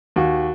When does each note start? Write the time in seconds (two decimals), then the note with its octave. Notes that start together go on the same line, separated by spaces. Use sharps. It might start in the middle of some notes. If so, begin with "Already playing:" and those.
0.16 D#2 F#4